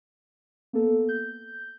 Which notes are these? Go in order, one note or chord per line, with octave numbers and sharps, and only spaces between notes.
A#3 B3 A4
G6